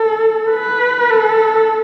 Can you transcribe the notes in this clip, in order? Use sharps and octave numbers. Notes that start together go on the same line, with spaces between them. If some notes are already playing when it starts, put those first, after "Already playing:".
Already playing: A4
B4
A4